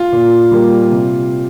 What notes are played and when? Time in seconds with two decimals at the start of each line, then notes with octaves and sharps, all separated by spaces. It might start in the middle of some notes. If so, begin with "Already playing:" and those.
Already playing: F4
0.12 A#2
0.51 G3 A#3
0.91 C3